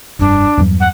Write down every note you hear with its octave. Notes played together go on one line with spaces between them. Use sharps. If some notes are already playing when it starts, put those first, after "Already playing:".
F1 G2 D4
E2 G2 F#3
F#5